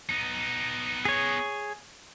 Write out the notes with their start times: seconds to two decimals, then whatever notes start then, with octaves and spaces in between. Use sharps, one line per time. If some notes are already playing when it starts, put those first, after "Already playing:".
0.09 B3 D#4
1.05 G#4 C#5